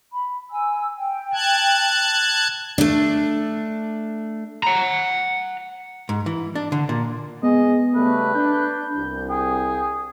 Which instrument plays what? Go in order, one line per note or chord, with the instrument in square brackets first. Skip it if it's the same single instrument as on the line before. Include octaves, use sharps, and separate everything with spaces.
[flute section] B5
G#5 E6
G5
[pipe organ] A5 F#6 G#6
[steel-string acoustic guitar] A3 D4
[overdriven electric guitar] F#5 A#5
[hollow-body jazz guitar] G#2
E3
D4
D3
A#2
[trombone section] G#3 G#4 [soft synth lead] B3 [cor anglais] D#5
[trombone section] C#3 G3 A3 [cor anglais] B4
[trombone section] D4 [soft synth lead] G6
[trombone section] C2
[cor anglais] G#4 [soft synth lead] G5